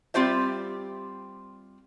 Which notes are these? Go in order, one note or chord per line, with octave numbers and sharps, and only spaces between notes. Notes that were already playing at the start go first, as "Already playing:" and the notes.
G3 C4 F4 G4 C5 E5